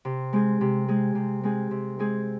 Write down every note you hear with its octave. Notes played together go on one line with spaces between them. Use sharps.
C3
G#3 C4 G#4
C3
G#3 C4 G#4
C3
G#3 C4 G#4
C3
G#3 C4 G#4